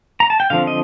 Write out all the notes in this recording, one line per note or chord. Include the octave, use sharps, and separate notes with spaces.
A#5
A5
G5
D3 F3 C4 F5
D#5